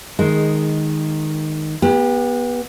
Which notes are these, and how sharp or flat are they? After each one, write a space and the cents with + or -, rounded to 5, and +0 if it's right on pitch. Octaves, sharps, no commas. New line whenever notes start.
D#3 -5 G#3 +0
B3 -20 G4 +30